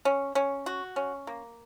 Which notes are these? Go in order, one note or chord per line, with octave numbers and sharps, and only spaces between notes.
C#4
C#4
F#4
C#4
A#3